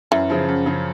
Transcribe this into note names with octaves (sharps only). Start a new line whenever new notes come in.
F#2 E3
C#3 F3
F#2
C#3 F3